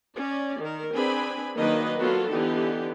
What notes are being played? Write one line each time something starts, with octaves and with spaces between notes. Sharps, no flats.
C#4 D5
D#3 A#4
C4 D4 G#4 B4 G#5 B5
D#3 F#3 A#3 D4 B4 D#5
F#3 A#3 B3 F4 F#4 A4
D3 E3 B3 D#4 G4